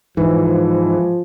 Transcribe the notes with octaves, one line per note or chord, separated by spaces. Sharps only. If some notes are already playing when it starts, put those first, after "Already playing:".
G#2 E3 F3